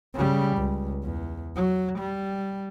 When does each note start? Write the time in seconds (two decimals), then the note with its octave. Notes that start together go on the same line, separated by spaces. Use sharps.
0.14 C#3 G3
0.56 C#2
1.03 E2
1.56 F#3
1.99 G3